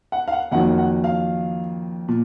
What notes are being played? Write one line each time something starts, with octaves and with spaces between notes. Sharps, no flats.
F#5
F5
F#5
F2 D#3 F#3 A#3 F#5
F#5
F5
A#2